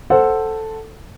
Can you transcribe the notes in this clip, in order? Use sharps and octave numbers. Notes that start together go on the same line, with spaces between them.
A4 C5 F#5